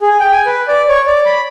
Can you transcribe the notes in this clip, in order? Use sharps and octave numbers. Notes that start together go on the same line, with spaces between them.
G#4
G5
G#5
B4
D5
C#5
D5
B5